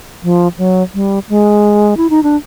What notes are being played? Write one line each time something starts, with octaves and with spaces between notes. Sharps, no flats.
F3
F#3
G3
G#3
E4
D#4
D4